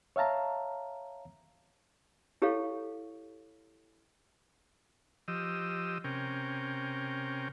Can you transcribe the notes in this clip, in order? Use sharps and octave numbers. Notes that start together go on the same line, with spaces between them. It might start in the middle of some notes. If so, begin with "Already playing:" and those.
C#5 E5 F5 A5 A#5
E4 G4 A4 C#5 F5
F3 G4 D#5 E6
C3 C#4 A#4 G5